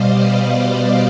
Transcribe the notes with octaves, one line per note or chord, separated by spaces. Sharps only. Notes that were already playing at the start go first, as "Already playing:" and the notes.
Already playing: B2 G3 C5 D5 D#5 F5
B4 D5